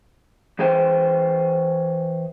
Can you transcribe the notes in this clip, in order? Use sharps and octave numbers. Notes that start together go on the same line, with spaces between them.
E3 G#4 C5 G5